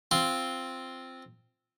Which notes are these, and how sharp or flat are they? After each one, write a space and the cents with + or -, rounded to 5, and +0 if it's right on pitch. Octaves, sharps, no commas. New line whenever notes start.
C4 +0 F4 +0